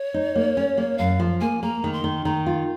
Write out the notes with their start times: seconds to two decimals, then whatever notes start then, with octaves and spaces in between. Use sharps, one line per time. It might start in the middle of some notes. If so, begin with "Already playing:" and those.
Already playing: C#5
0.14 D#4
0.35 A#3
0.57 C#4
0.77 A#3
0.98 F#2 F5
1.20 F3
1.41 A#3 G#5
1.63 A#3 A#5
1.84 D#3
1.93 C6
2.04 D#3
2.25 D#3 A#5
2.46 F4